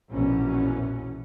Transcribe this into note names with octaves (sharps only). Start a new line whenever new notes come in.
A#1 E2 B2 E3 C#4